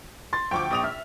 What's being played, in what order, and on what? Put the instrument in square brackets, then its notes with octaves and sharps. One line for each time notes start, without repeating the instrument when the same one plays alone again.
[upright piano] C6 A6
[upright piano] D2 F3 [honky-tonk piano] G5 C#6 D6
[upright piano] A#1 D#6 F7
[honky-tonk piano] E5 [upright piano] F6